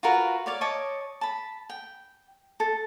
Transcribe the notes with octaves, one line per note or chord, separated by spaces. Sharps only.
F4 F#4 A#4 B4
C#5 D5 F5
C#5 D#5 A5 D6
A5 B5
G5
A4